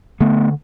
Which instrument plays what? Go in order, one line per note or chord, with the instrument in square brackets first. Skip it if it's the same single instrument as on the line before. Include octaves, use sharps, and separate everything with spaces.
[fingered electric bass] D3 A3 B3